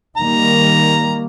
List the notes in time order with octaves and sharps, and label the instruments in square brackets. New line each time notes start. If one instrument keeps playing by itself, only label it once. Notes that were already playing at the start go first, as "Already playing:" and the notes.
[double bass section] D#3 G3 A#3 [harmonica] A#5